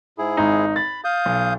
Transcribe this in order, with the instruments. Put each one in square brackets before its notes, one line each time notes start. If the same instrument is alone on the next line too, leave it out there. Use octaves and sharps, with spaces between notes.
[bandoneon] G#2 E4 G#4
[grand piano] G#1 D#4
[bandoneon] B5 [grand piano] A6
[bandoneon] F5 D#6 G6
[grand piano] B1